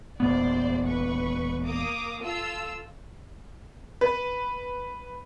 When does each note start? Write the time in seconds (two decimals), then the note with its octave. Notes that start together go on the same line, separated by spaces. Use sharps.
0.20 E1 A#2 B3 C5 D5
0.85 B4 C#6
1.64 A#3 D6 D#6
2.23 F4 A4 E6
4.01 B4